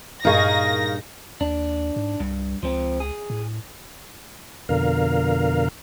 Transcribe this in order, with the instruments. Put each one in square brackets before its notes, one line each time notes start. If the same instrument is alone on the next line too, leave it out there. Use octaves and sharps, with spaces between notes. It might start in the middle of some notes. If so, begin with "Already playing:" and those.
[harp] G2 A#2 [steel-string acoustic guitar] D#4 G#4 [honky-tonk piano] A#4 F5 C#6 [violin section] A#6
[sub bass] D#2 [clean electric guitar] D4
[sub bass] G#2
[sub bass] C2 [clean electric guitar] G2
[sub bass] C#2 [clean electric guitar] F3 C4
[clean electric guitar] G#4
[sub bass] A2
[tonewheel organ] F2 B2 D3 A#4 F5